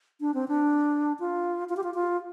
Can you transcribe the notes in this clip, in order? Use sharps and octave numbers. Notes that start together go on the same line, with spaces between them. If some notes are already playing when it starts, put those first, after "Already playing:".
D4
C4
D4
F4
F4
G4
F4
F4